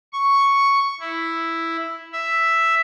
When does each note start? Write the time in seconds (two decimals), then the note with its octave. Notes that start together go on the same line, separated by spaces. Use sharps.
0.13 C#6
1.00 E4
2.12 E5